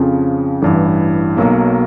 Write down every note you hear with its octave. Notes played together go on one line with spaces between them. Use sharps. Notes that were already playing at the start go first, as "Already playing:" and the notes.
Already playing: F2 C#3 F3
A1 G2 E3
B1 B2 F#3 A#3